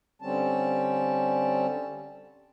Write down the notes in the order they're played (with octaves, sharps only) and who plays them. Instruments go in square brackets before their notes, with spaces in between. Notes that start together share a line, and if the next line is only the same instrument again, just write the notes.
[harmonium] D3 G3 C4 C#4 A5